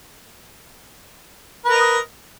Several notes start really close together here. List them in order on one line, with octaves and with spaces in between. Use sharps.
B4 A#4 D#5